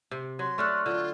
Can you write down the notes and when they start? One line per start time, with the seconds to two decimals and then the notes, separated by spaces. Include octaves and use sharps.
0.11 C3
0.39 F#3 C6
0.58 A3 D4 A4 C#6 F6 F#6
0.86 D3 F4